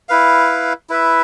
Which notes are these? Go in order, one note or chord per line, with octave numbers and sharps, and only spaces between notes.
E4 B4 F5
E4 B4 E5